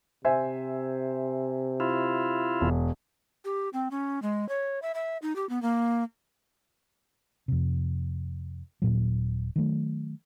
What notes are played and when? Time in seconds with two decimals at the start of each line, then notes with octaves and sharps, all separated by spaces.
0.25 C3 C5 E5 G#5
1.80 E4 F4
2.61 E1
3.45 G4
3.73 C4
3.91 C#4
4.22 G#3
4.49 C#5
4.82 E5
4.95 E5
5.22 D#4
5.36 G4
5.49 B3
5.62 A#3
7.48 F2 C3
8.82 D#1 A#2 F#3
9.56 D#3 F#3 A3